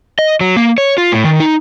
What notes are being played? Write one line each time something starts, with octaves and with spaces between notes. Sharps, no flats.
D#5
F#3
A#3
C#5
F4
A2
D#3
D#4